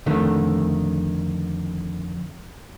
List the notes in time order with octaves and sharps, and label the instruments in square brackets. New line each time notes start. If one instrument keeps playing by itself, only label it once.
[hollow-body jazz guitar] F2 D3 D#3 A3